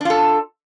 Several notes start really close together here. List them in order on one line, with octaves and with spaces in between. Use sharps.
D4 F4 A4